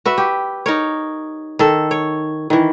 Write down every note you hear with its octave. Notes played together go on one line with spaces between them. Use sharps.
F#4 B4 E5
G4
D#4 A#4 C#5
D#3 A4
C#5
D#3 E3